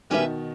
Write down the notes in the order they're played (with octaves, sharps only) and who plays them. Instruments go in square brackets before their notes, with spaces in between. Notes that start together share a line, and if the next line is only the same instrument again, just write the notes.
[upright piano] B2 D#3 [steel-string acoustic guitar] G3 C#4 G4 B4 E5